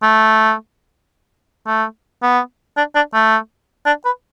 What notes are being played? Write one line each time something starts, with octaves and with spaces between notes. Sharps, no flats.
A3
A3
B3
D4
D4
A3
D4
B4